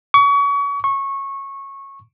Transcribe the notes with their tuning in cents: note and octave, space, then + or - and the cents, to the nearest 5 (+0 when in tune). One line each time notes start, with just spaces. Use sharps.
C#6 +35
C#6 -15